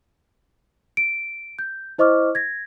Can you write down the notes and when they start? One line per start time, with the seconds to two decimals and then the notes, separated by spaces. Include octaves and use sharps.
0.97 D7
1.59 G6
1.98 E4 C5 D#5 C#6 D6 F6
2.35 G#6 A#6